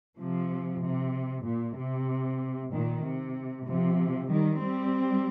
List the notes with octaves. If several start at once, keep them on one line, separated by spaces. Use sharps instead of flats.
C3 F3
C3
A#2
C3
A#2 D#3
C3
C3 F3
D#3 G3
G3 C4